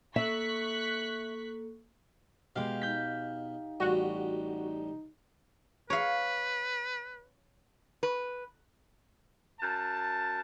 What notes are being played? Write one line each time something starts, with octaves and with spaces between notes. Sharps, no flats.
A#3 A4 E5 C#6 F#6 B6
B2 G#3 G4 F5
D#4 G6 B6
A1 G3 F#4
B4 C#5 F5
B4
F#2 A5